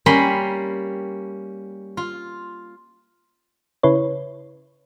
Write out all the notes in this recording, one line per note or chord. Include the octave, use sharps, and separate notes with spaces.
G3 A#3 C#4 B5 C6
F4
C#3 E4 B4 C#5